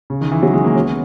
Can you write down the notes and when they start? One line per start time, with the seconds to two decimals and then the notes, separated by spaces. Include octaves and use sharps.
0.10 C#3
0.21 D#3
0.32 E3
0.43 F#3
0.53 G#3
0.64 A#3
0.76 C#4
0.84 B3